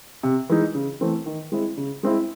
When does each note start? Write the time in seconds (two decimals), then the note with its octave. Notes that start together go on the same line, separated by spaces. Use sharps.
0.23 C3
0.49 E3 G#3 D#4
0.75 C#3
1.01 E3 A3 C4
1.26 D#3
1.52 G#3 C4 E4
1.77 C#3
2.03 G#3 C4 E4